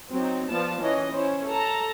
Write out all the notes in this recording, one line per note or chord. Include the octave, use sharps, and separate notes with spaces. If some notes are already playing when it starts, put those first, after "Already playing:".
F#3 C4 D#4
F3 B3 F4 D5 A5
E3 C#4 D#5
C#4 E4 C5
A4 A5 A#5